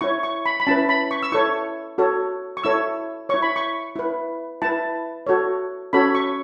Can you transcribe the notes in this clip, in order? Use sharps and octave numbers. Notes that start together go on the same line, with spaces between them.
E4 C#5 C#6
C#6
B5
B5
C#4 E4 B4 A5
B5
C#6
E6
E4 A4 C#5 C#6
F#4 A4 C#5
C#6
E4 A4 C#5 E6
E4 C#5 C#6
B5
C#6
E4 B4
E4 B4 A5
F#4 A4 C#5
C#4 F#4 A4 C#5 B5
C#6